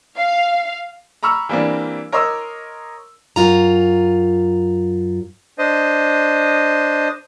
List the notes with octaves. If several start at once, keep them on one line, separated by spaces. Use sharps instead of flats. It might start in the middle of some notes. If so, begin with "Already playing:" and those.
F5
A#5 B5 C#6 E6 F6
E3 G3 A#3 C4 D4
A#4 C#5 D#5 C6 D6 E6
F#2 F4 A#5
D4 C5 D#5